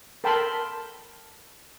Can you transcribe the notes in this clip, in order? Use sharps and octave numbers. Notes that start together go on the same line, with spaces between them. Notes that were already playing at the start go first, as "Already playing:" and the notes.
A4 A#4 G5 A5 B5 C6